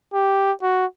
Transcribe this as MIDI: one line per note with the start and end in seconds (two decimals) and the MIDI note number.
0.14 0.52 67
0.62 0.86 66